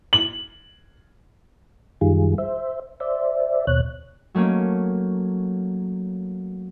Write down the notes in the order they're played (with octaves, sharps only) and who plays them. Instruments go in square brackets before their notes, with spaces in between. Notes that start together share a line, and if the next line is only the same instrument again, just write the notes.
[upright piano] F#7
[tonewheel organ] F#2 D#3 G3 F4 G#4
C5 E5
C5 D5 E5
D#2 B2 C#5 F#6
[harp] F#3 A3 A#3 C#4